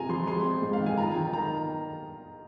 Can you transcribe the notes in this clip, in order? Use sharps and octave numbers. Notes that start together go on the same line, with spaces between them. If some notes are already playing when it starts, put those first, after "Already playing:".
Already playing: C3 G#3 F4 G#5 A#5
F3 C6
G#3 C6
C4
G#2
F5
D#3
G#5
F4 A#5
D#3
D#3 A#5